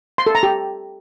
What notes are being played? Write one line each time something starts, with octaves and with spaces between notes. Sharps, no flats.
C6
A4
A#5
G4